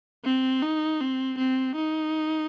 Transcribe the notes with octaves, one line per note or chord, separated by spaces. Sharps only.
C4
D#4
C4
C4
D#4